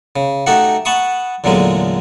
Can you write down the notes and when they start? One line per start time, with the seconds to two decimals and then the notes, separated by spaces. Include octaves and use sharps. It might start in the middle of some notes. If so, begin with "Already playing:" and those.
0.16 C#3
0.46 A3 D#4 F#4 G4 A4 F#5
0.85 F#5 A5 B5 C#6 D#6
1.44 E2 A#2 D3 F#3 G#3 A3